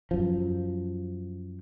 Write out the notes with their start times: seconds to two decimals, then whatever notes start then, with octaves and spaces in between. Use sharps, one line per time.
0.11 F#2 F3